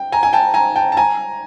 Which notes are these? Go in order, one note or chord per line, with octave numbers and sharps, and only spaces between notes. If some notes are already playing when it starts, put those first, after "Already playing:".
Already playing: G5
G#5 A#5
G#5
G5 A5
G#5 A#5
G5 A5
A5
G#5 A#5